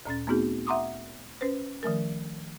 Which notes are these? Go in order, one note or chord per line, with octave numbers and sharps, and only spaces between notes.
D2 A#2 C#4 A6
A3 B3 C4 D#4 F#4 G#4
E5 F#5 A#5 C6 D6 D#6
C#4 B4 C5
D#3 F3 A3 A#4